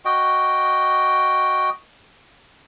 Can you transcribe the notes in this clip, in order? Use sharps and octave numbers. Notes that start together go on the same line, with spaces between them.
F#4 D#5 G5